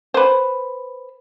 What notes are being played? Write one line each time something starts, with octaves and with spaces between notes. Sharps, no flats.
B4 C5